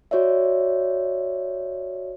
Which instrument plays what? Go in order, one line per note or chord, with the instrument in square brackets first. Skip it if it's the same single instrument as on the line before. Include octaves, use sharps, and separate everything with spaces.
[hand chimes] F#4 C#5 D5 E5